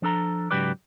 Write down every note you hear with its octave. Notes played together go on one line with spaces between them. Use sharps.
F3 D4 A4 A#5
G#2 C#3 F#3 G4 B4 D5